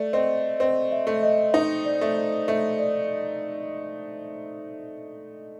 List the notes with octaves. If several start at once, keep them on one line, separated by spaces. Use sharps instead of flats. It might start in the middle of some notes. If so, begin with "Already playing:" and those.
Already playing: A3 D5
C4 D#5
C4 D#5
E5
A3
D#5
D#4
D5
A3
D#5
A3 D#5
D5